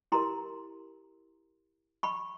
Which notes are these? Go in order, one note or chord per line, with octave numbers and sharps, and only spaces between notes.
E4 G4 A#4 A#5 C6
B5 C#6